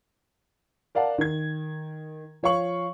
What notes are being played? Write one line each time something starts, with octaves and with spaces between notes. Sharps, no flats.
A#4 D5 F5 F#5 A5
D#3 G#6
F3 C#5 F5 C#6 F#7